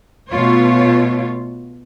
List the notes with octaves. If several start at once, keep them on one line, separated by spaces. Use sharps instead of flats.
B2 A3 F4 C#5